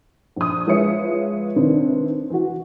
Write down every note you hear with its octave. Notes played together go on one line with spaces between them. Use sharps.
A#1 D#6
F3 G#3 B4 C#5 E5 C#7
C3 D#3 C4 D4 B4
E3 F#4